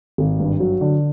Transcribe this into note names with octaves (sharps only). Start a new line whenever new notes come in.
G#1
G2
F#3
D3